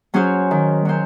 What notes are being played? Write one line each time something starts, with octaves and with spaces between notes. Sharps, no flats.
F#3 C#4 G#4 C5
D#3
F#3 C#4 C5